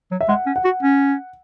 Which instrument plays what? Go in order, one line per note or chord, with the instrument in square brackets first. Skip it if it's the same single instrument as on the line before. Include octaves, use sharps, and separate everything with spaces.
[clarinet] F#3
[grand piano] E5
[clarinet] G#3 [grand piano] F#5
[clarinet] C#4
[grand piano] F#5
[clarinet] F#4
C#4